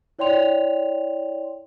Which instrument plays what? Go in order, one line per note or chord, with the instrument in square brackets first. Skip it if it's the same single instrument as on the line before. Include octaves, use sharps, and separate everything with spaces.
[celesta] E4 C#5 D5 G5 C6 F7